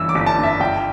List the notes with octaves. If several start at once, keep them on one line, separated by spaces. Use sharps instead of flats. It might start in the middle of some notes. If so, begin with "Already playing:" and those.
Already playing: G1 G2 E3 E6
D6
G1
A5
G2
E5
G1 G5